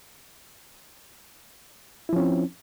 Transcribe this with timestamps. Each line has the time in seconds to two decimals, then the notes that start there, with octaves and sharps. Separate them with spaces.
2.09 E4
2.13 F3
2.16 C#4
2.20 C4